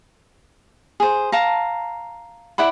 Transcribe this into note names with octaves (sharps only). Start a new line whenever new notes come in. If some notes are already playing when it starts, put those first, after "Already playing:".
G#4 C5
F5 A5 A#5
E4 D5 F#5 B5